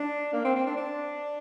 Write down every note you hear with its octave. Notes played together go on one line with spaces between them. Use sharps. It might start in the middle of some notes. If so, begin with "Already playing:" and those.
Already playing: D4
A#3
C4
C4
D4
D4